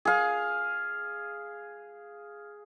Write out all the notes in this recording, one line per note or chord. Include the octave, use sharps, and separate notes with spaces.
G#4 F5